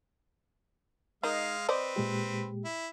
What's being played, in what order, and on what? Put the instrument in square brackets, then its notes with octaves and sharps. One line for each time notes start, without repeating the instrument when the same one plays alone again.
[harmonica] G#3 F5 [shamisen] D#4 A#4 D#5
[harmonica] C4 B4 [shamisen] C5 D5 D#5
[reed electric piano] A#2 G#3 G4
[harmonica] E4